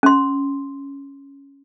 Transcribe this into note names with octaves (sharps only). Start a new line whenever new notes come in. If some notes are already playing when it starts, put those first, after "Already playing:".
C#4 C6